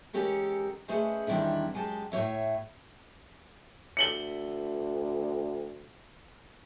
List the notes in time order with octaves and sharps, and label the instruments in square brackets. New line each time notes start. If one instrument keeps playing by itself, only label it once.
[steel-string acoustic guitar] E2 G#3 C#4 G4 A4 A#4
A3 C#4 G#4 B4 C5 D#5
E2 D#3 G3 C4 D4 E4
F#2 G#3 G4 A5
A2 A3 A#3 C#5 E5
[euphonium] D2 [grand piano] C#7 F#7 G7